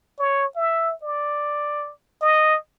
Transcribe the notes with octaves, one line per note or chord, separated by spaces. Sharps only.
C#5
E5
D5
D#5